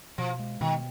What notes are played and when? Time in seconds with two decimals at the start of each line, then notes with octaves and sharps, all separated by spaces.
0.18 B2 F3
0.39 G#3
0.61 B2 D#3